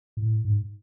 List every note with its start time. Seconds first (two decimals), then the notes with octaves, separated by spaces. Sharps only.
0.17 A2
0.45 G#2